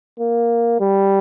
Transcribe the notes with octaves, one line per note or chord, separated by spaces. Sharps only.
A#3
G3